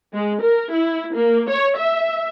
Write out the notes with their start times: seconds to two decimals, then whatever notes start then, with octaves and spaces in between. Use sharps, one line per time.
0.14 G#3
0.43 A#4
0.72 E4
1.15 A#3
1.49 C#5
1.78 E5